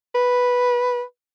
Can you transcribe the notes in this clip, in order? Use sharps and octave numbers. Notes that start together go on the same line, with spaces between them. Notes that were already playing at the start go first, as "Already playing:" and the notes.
B4